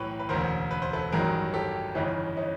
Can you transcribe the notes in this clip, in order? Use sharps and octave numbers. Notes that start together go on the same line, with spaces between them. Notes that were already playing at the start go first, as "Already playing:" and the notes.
Already playing: B1 A2 E3 G4 B4 C#5
B4
E1 D2 C#3 A#4 C5
B4
C5
A4 B4
A1 G2 D#3 F#3 G#4 A#4
G4 A4
G1 F2 C#3 E3 C#4 D#4
C#4 D#4